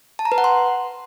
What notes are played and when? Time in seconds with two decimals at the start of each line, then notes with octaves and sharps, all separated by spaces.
0.19 A5
0.25 A#5
0.32 B4
0.38 F#5
0.44 C6